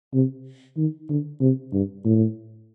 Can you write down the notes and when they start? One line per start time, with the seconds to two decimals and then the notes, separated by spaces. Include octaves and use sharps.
0.14 C3
0.77 D#3
1.09 D3
1.41 C3
1.73 G2
2.05 A2